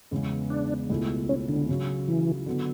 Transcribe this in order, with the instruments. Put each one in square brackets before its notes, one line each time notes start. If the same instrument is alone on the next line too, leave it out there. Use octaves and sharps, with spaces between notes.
[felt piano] E2 C#3 G#3 B3
[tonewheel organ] D4
[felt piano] C#2 B2 A3 E4
[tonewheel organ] C#4
D3
[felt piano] C#3 F#3 C#4
[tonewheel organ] E3
[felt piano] D3 F#3 B3